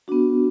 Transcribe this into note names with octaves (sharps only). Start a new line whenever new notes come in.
B3 D4 F#4